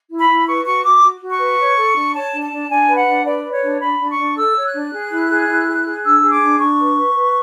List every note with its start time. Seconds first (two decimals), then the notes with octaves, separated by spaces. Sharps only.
0.10 E4
0.19 B5
0.29 E4
0.47 B4 C#6
0.65 F#4 C#6
0.84 F#4 D6
1.03 F#4
1.22 F#4
1.31 C#6
1.39 B4
1.58 C#5
1.77 A4
1.95 D4
2.14 C#5 A5
2.33 D4
2.42 A5
2.52 D4
2.69 D4 G#5
2.88 B4
2.97 F#5
3.07 D4
3.25 B4 D5
3.44 B4
3.53 C#5
3.63 D4
3.81 D4 B5
3.99 D4
4.09 C#6
4.18 D4
4.36 A4 E6
4.56 C#5
4.65 F#6
4.74 D4
4.92 G#4
5.11 E4
5.30 G#4
5.48 E4
5.67 G#4
5.86 G#4
6.04 D4 E6
6.22 G#4
6.31 D6
6.41 D4
6.59 D4 C#6
6.79 B4
6.96 B4
7.16 B4